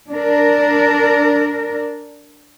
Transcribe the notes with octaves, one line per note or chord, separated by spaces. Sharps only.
D4 A#4